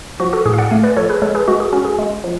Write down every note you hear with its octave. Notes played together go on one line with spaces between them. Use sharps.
F3 F#4
F#4 A4
A2 G#4
F5
D5 F#5
A3 F5 G#5
B4 D5
F3 A4 C#5
G#4 B4
G#3 A4 C#5
G#4 B4
G#3 F#4
G#4
C#4 F#4
G#4
G#3
F3